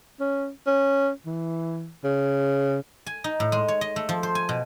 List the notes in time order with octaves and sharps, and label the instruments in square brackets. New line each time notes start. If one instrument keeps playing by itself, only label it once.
[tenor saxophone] C#4
C#4
E3
C#3
[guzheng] G#5
D#4
A2
G#3
C#5
D#5
A3
F3
C5
G#5
B2